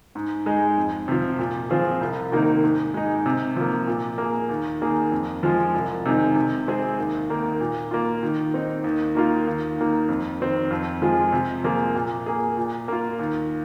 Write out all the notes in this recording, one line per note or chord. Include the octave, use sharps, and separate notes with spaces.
G#2
G#3 D#4 G#4
F2
C3 F3
A#2
F3 C4 F4 G#4
C2
C3 D#3 A#3 D#4
G#2
G#3 D#4
C3
F3 A#3
A#2
A#3 G#4
D#2
D#3 A#3 G#4
F2
F3 G#3 F4
C2
C3 D#3 G#3 D#4
C3
G#3 C4 G#4
D#2
D#3 A#3
A#2
A#3 F4
D#3
C4 D#4
D#2
D#3 A#3 F4
D#2
D#3 A#3
F2
D#3 C4
F2
F3 G#3 F4 G#4
C3
F3 A#3 F4 G#4
A#2
A#3 G#4
A#2
A#3 F4
D#2